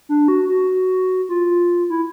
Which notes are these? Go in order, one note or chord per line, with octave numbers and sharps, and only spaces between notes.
D4
F#4
F#4
F4
E4